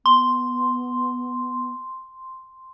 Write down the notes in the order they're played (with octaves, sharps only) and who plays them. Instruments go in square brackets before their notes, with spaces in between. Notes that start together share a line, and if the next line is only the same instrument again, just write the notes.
[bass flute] B3 [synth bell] C6